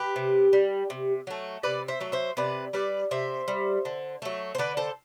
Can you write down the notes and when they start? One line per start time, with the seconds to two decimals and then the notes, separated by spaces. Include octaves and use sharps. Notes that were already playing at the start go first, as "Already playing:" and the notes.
Already playing: G4 B4
0.16 C3
0.53 G3
0.90 C3
1.27 F#3 A3
1.63 C3 B4 D5
1.88 C5 E5
2.00 F#3 A3
2.12 C5 E5
2.37 C3 B4 D5
2.73 G3 B4 D5
3.11 C3 C5 E5
3.48 G3
3.85 D3
4.22 F#3 A3
4.55 C5
4.58 D3 B4 D5
4.77 A4 C5